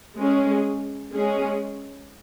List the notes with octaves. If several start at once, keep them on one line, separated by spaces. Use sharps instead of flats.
G#3 C#4 G#4
G#3 C#4 G#4